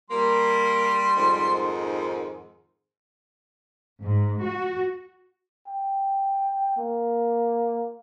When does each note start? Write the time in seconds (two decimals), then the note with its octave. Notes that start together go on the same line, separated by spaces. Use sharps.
0.10 G3 A#3 C6
1.16 F2 G#2 D#3
4.03 G#2
4.43 F#4
5.68 G5
6.77 A#3